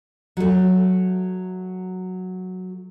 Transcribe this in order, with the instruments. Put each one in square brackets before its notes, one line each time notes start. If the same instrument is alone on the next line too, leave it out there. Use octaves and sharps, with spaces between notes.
[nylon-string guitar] F#3 A3